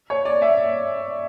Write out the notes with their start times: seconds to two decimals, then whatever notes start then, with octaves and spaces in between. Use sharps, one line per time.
0.10 C#5
0.25 D5
0.42 E5